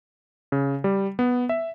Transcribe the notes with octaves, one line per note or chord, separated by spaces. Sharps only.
C#3
G3
B3
E5